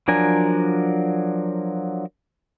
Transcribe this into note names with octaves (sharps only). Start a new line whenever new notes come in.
F3 F#3 D4 A#4 G#5